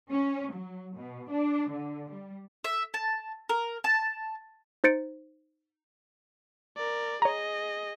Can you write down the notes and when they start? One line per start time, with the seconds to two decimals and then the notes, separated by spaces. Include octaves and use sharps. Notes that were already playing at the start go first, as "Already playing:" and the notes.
0.11 C#4
0.52 F#3
0.96 B2
1.30 D4
1.70 D3
2.11 G3
2.64 E5
2.94 A5
3.49 A#4
3.84 A5
4.84 D#4 C5 A6 C#7 D7
6.77 A#4 D5
7.22 G#4 C#5 D#5 A#5